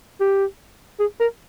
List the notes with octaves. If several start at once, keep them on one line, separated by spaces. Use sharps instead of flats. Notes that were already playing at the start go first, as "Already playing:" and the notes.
G4
G#4
A#4